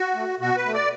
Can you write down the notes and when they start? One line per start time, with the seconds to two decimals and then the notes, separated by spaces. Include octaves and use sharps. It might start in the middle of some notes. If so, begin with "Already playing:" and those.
Already playing: F#4
0.15 A3
0.40 B2 F#4
0.57 B4
0.66 A3
0.74 D5